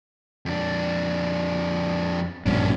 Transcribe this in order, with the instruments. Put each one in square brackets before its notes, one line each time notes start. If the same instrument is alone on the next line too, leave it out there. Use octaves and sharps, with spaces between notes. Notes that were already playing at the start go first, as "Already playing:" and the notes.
[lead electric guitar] F2 D4
[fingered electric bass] A#1 G2 B2 [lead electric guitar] C#4 D4